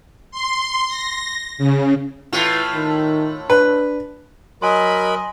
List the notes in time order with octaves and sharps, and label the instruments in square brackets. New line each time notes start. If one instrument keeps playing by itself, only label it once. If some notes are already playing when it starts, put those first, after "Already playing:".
[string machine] C6
A#6
C#3
[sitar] A2 A3 F4 [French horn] E3
[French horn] D#3
[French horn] D4 [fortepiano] B4
[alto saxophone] F#3 [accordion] A#4 B5 [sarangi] D#5 [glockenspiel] G#5 C6